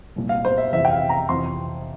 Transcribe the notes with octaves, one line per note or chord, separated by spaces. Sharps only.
C2 A#2
F5
C5
E5
F2 C3 E3 E5
G5
F5
A#5
F2 C3 E3 C6